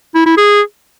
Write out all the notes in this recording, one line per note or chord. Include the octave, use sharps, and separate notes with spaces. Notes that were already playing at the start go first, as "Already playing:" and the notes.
E4
E4
G#4